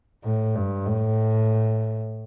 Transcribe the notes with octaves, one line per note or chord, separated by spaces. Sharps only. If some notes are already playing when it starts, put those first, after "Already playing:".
A2
G2
A2